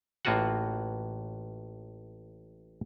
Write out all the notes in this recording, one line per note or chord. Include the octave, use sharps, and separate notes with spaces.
A1 A2 A#3 F4 F#4 F#5